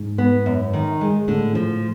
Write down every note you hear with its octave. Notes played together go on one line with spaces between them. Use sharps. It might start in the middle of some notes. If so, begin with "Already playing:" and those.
Already playing: G#2
B3
F#2
D#3
G#3
A2 D3
F3